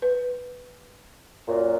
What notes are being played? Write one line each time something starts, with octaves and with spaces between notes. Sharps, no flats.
B4
F#2 A#2